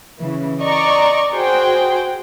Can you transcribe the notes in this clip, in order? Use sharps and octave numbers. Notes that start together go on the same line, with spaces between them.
C#3 E3
D5 D#5 A#5 C#6
F#4 G#4 C5 G5